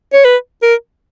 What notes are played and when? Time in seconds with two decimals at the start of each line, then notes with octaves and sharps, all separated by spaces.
0.13 C#5
0.25 B4
0.62 A#4